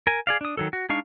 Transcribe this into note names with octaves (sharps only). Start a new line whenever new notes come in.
A#4 G#5
G#4 D5 F5
D4 D#6
D#3 F#3 A4
F#4
G#3 D4 D#4 F5 C#6